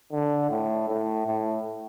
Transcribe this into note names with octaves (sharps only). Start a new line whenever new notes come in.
D3
A2
A2
A2